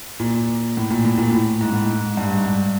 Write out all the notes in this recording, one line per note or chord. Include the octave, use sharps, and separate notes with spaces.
A#2
A2
A#2
A2
A#2
A2
G#2
A2
G#2
G2
G#2
G2